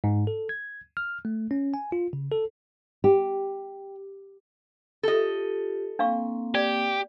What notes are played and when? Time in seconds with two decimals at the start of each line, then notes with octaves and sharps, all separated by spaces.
0.04 G#2
0.27 A4
0.49 G#6
0.97 F6
1.25 A3
1.51 C#4
1.74 G#5
1.92 F4
2.13 C#3
2.32 A4
3.04 G4
5.03 F4 G4 A4 D#5
5.99 A#3 C4 D4 F5 C#6
6.55 G4 D5